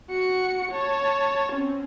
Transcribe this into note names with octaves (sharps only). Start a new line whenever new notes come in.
F#4 C#7
C#5 A5
C4 C#4